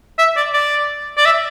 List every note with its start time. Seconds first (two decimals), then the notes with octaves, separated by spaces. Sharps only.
0.19 E5
0.37 D5
0.54 D5
1.17 D5
1.26 E5